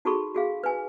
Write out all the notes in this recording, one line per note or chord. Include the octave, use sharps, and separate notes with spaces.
D#4 F#4 G#4 A4 B5 C#6
F#4 G#4 F5
B4 G#5